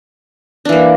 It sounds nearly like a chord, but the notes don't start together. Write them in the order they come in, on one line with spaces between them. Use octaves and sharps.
D4 E3 A#3